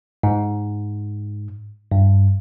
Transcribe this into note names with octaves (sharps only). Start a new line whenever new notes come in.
G#2
G2